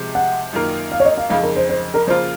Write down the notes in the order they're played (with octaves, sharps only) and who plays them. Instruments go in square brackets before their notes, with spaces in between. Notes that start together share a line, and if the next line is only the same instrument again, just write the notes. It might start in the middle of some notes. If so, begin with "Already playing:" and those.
Already playing: [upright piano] C3 F3 G#3
[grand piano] F#5
[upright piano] F#2 D#3 A#3 F4 A#4
[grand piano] F5
C#5
D#5
F5
[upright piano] F2 C#3 G#3 D#4 [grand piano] F5
[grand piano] A#4
C5
C5
A#4
[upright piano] C#3 F3 A#3 F4 A#4 [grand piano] C5